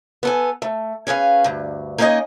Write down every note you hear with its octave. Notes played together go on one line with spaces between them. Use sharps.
B3 A4 G#5
A3
C#4 G#4 B4 F5
D2 G2
A#3 C#4 D#4 G4 D#5 G#5